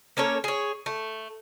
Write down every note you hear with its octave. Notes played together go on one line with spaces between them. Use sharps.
A#3 C#4 A4 C#5
G#4 C#5
A3